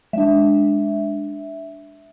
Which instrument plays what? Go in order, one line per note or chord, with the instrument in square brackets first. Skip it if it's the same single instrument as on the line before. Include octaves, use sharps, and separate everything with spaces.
[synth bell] G#3 D4 E5